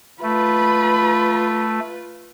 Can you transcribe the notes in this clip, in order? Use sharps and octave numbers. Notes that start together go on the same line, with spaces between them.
A3 F4 B4 B5